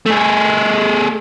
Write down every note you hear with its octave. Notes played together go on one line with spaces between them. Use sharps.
A3 G#4